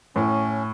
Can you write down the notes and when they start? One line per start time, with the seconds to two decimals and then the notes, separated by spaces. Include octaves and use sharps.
0.16 A2 C#4